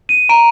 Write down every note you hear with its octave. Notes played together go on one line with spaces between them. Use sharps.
D#7
A#5 D7